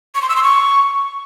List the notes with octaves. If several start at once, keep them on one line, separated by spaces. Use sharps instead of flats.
C#6
C6
E6
C6
C#6